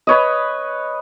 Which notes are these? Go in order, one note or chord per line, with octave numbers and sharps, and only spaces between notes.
B4 C#5 D#5